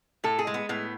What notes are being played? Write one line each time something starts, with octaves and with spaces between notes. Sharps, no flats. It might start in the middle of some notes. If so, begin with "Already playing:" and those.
A2 A4
G#4
G#3
B3
A2 B3